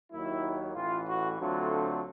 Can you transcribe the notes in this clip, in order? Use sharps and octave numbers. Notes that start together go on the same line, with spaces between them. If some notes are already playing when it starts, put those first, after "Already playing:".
D#2 D#3 F#3 A#3 E4
A1 A2 E3 F4
F#4
D2 D3 F#3 A3 C4 F4